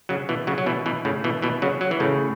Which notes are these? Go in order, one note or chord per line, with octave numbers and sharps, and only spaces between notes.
C#3 F#3
B2 E3
C#3 F#3
F#3
B2 E3
B2 E3
A2 C#3
B2 E3
B2 E3
C#3 F#3
F#3
E3
A2 C#3